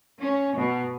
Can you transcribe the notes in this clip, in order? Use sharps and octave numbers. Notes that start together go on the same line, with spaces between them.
C#4
B2